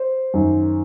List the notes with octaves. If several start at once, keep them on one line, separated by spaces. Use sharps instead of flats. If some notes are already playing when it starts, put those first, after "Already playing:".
Already playing: C5
F#2 D#3